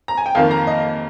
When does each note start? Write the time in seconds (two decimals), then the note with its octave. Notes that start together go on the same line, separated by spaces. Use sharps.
0.08 A#5
0.17 G#5
0.26 G5
0.35 F2 D#3 A#3 F5
0.51 A#5
0.67 D#5